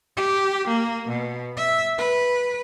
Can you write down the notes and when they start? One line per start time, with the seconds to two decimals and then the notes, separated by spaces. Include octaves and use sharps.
0.17 G4
0.68 A#3
1.09 B2
1.57 E5
1.99 B4